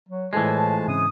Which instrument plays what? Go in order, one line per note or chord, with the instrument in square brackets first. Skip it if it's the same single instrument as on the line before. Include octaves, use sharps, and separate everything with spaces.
[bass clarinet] F#3
[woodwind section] F2 A3 A5 [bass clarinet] A2 [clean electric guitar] E3 G#3
[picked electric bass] G#2 C#3 [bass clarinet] C4 [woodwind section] D#6